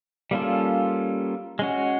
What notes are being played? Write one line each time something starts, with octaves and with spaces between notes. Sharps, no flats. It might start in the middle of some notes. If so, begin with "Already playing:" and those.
G3 A#3 C#4 F4 A4
G#3 C#4 F#4